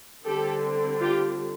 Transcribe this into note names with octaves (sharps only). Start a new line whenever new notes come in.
D3 G3 C4 G4 A4
F4 G4